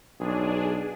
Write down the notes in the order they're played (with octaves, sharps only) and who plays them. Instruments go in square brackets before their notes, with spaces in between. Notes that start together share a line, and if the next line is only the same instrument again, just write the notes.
[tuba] B1 [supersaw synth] D4 G#4